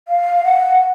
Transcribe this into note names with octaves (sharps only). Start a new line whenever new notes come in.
F5
F#5